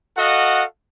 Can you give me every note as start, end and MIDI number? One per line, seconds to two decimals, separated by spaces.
0.17 0.64 66
0.17 0.64 69
0.17 0.64 75
0.17 0.64 77
0.17 0.64 78